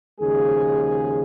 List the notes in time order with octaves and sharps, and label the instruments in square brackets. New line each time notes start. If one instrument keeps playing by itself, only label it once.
[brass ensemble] D#2 C#3 F3 G#3 G#4